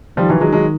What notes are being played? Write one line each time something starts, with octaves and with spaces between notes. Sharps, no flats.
D#3 F3 G3
E3 F#3
F#3 G#3
F#3 G#3